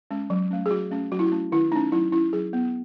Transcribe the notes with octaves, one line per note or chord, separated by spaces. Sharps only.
G#3 C#4
F#3
A3 C#4
G#4
F#3 F#4
A3 C#4
F#3 F#4
E4
F#4
A3 C#4
D#3 E4
A3 C#4 D#4
F#3 E4
C#4 E4
F#3 G#4
B3